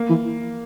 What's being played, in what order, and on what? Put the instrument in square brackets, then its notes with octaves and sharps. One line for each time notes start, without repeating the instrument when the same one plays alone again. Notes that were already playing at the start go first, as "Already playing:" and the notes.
Already playing: [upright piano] A#3
[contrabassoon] E3